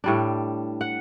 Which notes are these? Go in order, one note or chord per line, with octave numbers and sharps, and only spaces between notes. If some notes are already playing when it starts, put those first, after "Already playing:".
A2 G3 D4
F#5